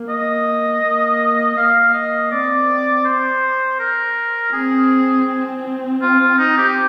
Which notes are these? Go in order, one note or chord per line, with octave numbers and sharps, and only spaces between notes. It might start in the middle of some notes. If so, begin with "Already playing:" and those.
Already playing: A#3
D#5
A#3
A#3 F5
D#5
C4 D5
C5
A#4
C4 G#4
F4
F4
D#4
G4